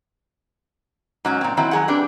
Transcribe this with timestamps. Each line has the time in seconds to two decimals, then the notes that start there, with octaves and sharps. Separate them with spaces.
1.25 G#2 F#3 C#4
1.41 A#2 C4
1.57 D#3 F#3 C4 E4
1.71 F#3 G#4 F#5
1.88 C4 D4 G4 B4